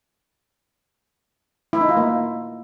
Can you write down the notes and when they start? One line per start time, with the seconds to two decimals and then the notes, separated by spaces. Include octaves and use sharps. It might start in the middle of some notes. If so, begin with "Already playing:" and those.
1.73 E4
1.81 D#4
1.89 F4
1.97 A#3